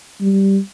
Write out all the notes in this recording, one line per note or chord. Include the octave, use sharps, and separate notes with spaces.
G3